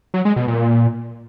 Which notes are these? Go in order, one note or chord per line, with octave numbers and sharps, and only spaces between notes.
F#3
G#3
B2
A#2